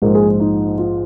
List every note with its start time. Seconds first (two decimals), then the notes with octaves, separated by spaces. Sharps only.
0.02 A#1 G#2 F3 G#3 A#4
0.15 G#4
0.40 D#4
0.78 F4